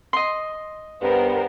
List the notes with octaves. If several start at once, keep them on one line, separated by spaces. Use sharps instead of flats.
D#5 C6
G2 B3 A#4 C5